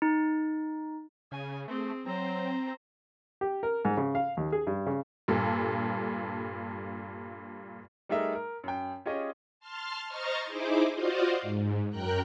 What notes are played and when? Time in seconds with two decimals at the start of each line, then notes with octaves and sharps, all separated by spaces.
0.02 D#4
1.32 C#3 G#5
1.68 A3 C4 G#4
2.06 F#3 C4 C5 A#5
3.41 G4
3.63 A#4
3.85 G#2
3.97 C#3
4.15 F5
4.37 D#2
4.52 G#4
4.67 G2
4.87 C#3
5.28 G2 A#2 A4
8.09 G3 A3 D#4 G#4 A#4 E5
8.35 A#4
8.64 F#2 G5
9.06 C#4 F4 G4 G#4 C#5 D#5
9.60 A5 C6 F6
10.06 C5 D#5 A#5 C#6 F6 A6
10.45 D#4 E4 G#4 C5 D6
10.93 F4 F#4 C5 D5 D#5 F5
11.42 G#2
11.89 F#2 A#4 G5 A#5 F#6